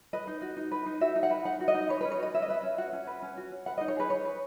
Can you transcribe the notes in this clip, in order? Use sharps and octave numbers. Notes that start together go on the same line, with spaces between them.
B4 D#5
D#4
F#4
D#4
B4
D#4
F#4 E5
D#4
F#5
B4
D#4 F#5
F#4
D#5
D#4
B4 C#5
C#4 B4
C#5
F#4 D#5
C#4 E5
D#5
B4 E5
C#4
F#4 F#5
C#4
B4
C#4
F#4
C#4
B4 F#5
D#4 D#5
C#5
G#4 B4
D#4 C#5
B4